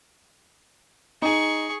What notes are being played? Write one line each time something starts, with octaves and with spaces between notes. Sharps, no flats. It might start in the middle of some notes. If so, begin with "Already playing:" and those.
D#4 G#4 C#6